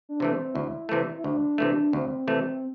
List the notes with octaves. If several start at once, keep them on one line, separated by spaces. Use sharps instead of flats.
D4
C3 E3 A3
C4
D2 E4
C3 E3 A3
E4
D2 D4
C3 E3 A3
D2 C4
C3 E3 A3